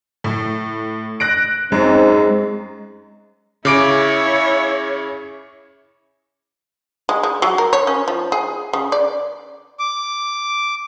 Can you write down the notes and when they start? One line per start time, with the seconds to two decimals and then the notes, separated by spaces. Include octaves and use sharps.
0.24 A2
1.20 F#6 A#6 D7
1.72 F#2 G#3 C4 D#4
3.65 C#3 E4 C#5 D6 D7
7.09 G#3
7.23 G#3
7.42 F#3
7.58 A#4
7.73 C#5
7.87 C#4
8.08 F3
8.32 G#4
8.73 C#3
8.92 D5
9.79 D6